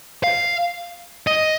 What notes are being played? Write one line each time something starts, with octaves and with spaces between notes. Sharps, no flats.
F5
D#5